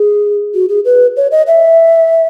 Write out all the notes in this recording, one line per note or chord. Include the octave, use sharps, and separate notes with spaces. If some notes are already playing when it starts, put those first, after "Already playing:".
Already playing: G#4
F#4
G#4
B4
C#5
D#5
E5